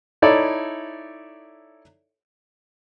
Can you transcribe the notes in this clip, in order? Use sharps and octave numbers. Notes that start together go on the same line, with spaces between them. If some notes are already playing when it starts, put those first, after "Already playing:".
D#4 E4 A4 C#5 D5 E5